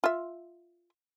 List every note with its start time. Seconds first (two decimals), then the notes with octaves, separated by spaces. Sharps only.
0.04 F4 E5